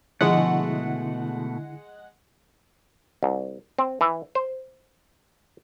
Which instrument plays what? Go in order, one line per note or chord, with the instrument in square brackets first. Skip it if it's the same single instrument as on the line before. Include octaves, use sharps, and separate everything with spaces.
[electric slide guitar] B2 A3 [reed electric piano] D3 E4 [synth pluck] F3 [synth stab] G#3 F#5
[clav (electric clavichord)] C2
C4
E3
C5